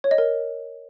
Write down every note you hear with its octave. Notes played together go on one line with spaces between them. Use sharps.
C#5
D#5
A#4